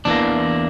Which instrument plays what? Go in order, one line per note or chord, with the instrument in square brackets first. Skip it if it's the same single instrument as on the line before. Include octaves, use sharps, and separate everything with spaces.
[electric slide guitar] E2 E3 A#3 D4